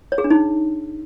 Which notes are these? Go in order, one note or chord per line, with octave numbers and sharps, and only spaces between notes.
C#5
G#4
D4
D#4